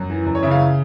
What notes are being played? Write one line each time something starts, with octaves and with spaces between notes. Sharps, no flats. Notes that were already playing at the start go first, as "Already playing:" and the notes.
Already playing: F#2
E3
F#2
C#5
C#3 E5
F5